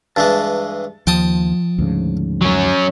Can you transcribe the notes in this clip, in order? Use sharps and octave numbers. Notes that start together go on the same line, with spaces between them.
G2 E3 G#3 A5
D#2 F3 G5 A5 D#6
D2 G#2 C#3
F#3 C#4